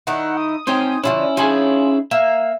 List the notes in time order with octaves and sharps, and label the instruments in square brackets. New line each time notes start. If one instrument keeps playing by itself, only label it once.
[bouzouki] D#3 D#4 E4 [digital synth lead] F#5
[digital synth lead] D#6
[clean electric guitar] C4 D#4 G5 [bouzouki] C#4 C5
[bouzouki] D3 F3 G#3 [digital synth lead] C#4 [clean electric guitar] E4
[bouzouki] F3 G#5 [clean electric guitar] D#4 E4 G#4
[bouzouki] A#3 [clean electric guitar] E5